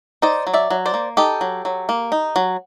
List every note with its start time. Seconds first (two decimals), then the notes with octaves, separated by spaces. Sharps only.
0.22 D#4 C5 D5
0.47 F#3
0.54 D5 E5
0.70 F#3
0.86 C5 D5
0.94 A#3
1.17 D#4 G4 A4
1.41 F#3
1.65 F#3
1.89 A#3
2.12 D#4
2.36 F#3